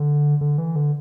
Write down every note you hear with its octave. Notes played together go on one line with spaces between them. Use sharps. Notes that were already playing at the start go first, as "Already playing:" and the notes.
Already playing: D3
D3
E3
D3